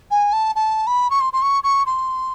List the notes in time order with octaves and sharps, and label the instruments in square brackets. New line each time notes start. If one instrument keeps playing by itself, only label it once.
[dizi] G#5
A5
A5
B5
C#6
C6
C6
C#6
C#6
C6